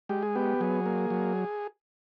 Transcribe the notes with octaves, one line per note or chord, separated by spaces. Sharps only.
G#3 G4
G#4
B3 G4
F#3 G#4
A#3
F#3